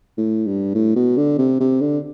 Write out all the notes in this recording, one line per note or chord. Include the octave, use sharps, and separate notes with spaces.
A2
G2
A2
B2
D3
C3
C3
D3